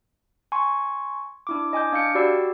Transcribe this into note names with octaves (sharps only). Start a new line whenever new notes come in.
G#5 C6 C#6
D4 E4 D6
D#5 G#5 D6 G6
D4 F5 G6 C#7 D7
F#4 G4 D5 B5 E6 C7